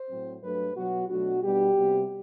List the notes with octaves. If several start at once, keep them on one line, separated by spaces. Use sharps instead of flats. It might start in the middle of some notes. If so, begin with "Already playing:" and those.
Already playing: C5
A2 F#3 C4
G2 F#3 A3 D4 B4
B2 F#3 B3 F#4
B2 F#3 A3 D4 F#4
B2 G3 B3 D4 G4
C3 G3 B3